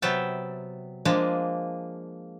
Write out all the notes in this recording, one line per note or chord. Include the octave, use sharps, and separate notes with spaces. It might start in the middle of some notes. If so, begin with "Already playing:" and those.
C3 F#3 B3 E5 G5 A5
F3 G#3 A#3 D4